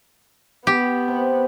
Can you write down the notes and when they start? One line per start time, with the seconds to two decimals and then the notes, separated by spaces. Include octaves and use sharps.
0.67 B3 G4
1.08 C3